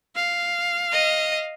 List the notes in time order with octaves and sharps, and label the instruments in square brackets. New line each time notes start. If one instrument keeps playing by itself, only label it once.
[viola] F5
[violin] D#5